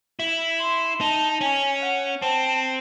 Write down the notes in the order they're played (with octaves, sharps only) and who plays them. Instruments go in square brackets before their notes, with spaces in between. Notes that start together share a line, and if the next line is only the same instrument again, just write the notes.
[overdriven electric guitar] E4
[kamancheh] C6
[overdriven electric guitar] D#4 [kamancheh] A5
[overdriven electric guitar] C#4 [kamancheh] G#5
[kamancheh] F#5
[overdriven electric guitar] C4 [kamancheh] A5